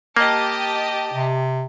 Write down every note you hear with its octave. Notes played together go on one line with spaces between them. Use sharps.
A#3 G4 D#5 A5
C3